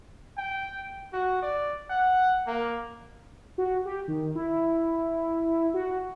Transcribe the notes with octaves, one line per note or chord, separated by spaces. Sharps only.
G5
F#4
D5
F#5
A#3
F#4
G4
D#3
E4
F#4